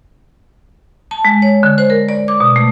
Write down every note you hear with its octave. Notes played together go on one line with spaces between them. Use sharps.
A5
G#3
C#5
D3
C5
A#4
D5
D6
B2
A3